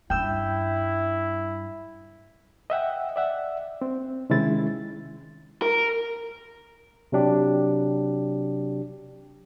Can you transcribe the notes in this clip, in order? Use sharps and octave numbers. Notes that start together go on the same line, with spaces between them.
G2 C#4 E4 G5 E6
D#5 E5 F#5 G5
D5 E5 F#5
C4
C3 D#3 G#3 C#4 E4 A6
A#4
C3 F#3 D4 G4